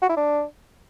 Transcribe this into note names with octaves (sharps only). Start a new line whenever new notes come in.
F#4
E4
D4